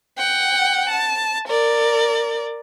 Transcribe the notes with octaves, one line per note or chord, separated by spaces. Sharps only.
F#5 G5
A5
A#4 D5